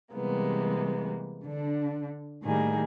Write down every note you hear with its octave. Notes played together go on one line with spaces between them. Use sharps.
C3 E3 G3 G#3 A#3 B3
D3 D4
A2 D#3 G3 A#3 G#4